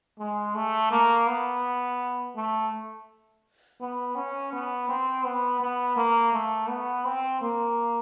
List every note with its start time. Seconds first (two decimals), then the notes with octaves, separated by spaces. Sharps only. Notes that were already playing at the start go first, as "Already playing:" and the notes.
0.19 G#3
0.55 A3
0.91 A#3
1.27 B3
2.36 A3
3.80 B3
4.15 C#4
4.52 B3
4.89 C4
5.25 B3
5.60 B3
5.97 A#3
6.33 A3
6.69 B3
7.05 C4
7.41 A#3